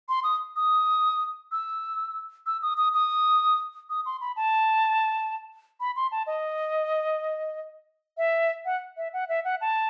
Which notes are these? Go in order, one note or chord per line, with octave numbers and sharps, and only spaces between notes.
C6
D#6
D#6
E6
E6
D#6
D#6
D#6
D#6
C6
B5
A5
B5
C6
A5
D#5
E5
F#5
E5
F#5
E5
F#5
A5